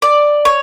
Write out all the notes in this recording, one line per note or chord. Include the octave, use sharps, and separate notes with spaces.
D5
C#5